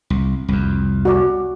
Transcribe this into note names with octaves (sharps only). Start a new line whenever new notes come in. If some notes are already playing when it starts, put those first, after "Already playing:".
C2
C2 F2
F#4 D5